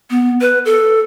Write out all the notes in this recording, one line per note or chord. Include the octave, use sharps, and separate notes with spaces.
B3
B4
A4